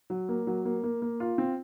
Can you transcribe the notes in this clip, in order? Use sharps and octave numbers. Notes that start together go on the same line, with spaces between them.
F#3
A#3
F#3
A#3
A#3
A#3
F4
C4